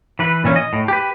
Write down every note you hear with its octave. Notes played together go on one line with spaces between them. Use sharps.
E3 B4
A#2 E3 C#4
D#5
A2
G4 B4